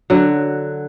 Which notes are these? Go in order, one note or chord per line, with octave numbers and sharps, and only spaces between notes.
D3 F#3